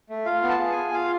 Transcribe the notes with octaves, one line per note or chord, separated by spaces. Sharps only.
A3
F4 F5
B3
A5
G#4
G#5
F4
F4 F5